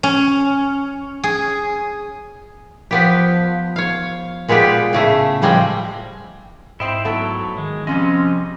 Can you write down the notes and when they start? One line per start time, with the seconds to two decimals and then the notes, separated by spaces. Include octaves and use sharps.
0.03 C#4
1.24 G#4
2.91 F3 B3 G4
3.76 C#5 F5
4.48 A#2 G#3 B3 F4 G4
4.93 A2 C#3 A3
5.42 A2 F3 G3 G#3 C4
6.80 G#2 C4 E4 C5 D#5 G5
7.05 F#3 A3 B3 E4
7.58 D#3 G#3
7.87 F2 C3 F3 G3 C4 C#4 D#5